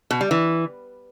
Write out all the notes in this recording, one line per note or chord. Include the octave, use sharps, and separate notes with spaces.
B2
G3
E3